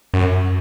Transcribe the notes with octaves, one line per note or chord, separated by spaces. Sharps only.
F#2